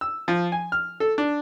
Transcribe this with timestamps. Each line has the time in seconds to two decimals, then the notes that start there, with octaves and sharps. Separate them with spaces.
0.01 E6
0.28 F3
0.52 G#5
0.72 F6
1.00 A4
1.18 D4